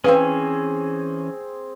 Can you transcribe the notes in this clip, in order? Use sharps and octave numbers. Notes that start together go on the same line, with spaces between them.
E3 C4 C#4 G#4 B4 F5